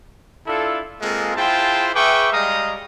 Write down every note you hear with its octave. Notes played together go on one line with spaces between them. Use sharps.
D4 E4 F4 A4
G#3 A#3 C4 F4 G#4 A4
E4 F4 G#4 C5 G5 A5
G#4 B4 E5 G5 C#6 D6
G3 G#3 D#5 F5 A#5 D#6